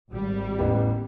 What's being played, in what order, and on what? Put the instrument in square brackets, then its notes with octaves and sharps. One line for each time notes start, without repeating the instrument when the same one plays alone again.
[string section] G#1 G3
[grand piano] A1 B3 G4